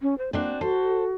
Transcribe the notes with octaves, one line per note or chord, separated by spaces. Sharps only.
C#4
C5
A#3 C4 D4 F#4
F#4 A4 C5